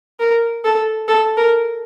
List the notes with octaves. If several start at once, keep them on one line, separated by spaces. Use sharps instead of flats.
A#4
A4
A4
A#4